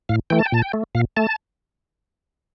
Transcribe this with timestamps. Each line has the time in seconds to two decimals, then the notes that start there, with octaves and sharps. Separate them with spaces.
0.09 A2 F5
0.30 E3 A3 G5
0.39 A5
0.46 G5
0.52 A#2 A5
0.62 G5
0.73 A3
0.95 A#2 F5
1.17 A3 A5